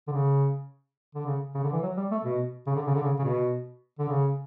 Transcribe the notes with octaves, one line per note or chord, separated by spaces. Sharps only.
D3
C#3
D3
C#3
C#3
D3
E3
F#3
G3
A3
B2
C#3
D3
C#3
D3
C#3
C#3
B2
D3
C#3